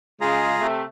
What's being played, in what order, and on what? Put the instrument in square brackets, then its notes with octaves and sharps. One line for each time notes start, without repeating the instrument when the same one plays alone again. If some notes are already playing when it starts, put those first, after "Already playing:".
[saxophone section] C#3 G#3 [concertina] F4 G#4 A#5
[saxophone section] C3 A3